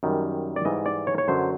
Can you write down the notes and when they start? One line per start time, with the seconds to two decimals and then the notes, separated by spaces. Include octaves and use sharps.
0.03 F#2 D#3 G3
0.56 D5
0.65 G#2 E3 G3 D#5
0.86 D5
1.07 C#5
1.18 C#5
1.28 F#2 D3 F#3 C5